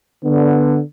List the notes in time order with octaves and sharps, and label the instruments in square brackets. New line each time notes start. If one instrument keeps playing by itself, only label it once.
[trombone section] D3 B3